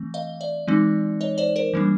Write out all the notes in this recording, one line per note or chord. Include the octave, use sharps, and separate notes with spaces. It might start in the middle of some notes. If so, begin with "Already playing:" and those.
Already playing: E3 A3 C4
D#5 F5
D5 E5
E3 G#3 C4 D#4
C#5 D#5
C5 D5
A#4 C5
E3 G3 A#3 D4